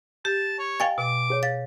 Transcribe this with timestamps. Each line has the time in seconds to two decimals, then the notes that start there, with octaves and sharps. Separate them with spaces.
0.25 G4 A5
0.59 C#5
0.80 D#5 F5 G5 G#5 A6
0.98 B2 D6
1.30 G#4 C#5
1.43 F5 A6